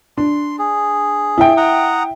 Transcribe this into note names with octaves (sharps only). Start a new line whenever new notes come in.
D4 C6
G#4
E4 G5
F#5 A#5 D#6